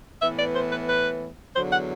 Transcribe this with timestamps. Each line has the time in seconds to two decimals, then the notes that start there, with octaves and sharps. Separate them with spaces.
0.22 A2 E3 B3 E5
0.39 D5
0.56 C5
0.72 B4
0.89 B4
1.56 E2 D3 F#3 C5
1.73 F#5